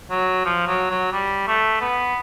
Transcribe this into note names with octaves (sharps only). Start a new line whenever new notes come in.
F#3
F3
F#3
F#3
G3
A3
B3